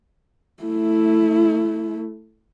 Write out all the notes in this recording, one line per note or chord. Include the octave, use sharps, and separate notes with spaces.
A3 E4